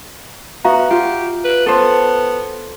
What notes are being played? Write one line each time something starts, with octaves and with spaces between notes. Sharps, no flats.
B3 F#4 E5 F5 A#5
F4 G4
B4
B3 A4 C5